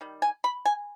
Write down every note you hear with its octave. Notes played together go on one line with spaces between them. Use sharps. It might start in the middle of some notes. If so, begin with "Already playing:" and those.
D#3 G3
G#5
B5
G#5